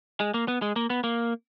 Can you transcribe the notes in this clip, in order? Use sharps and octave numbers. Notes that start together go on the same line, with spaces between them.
G#3
A#3
B3
G#3
A#3
B3
A#3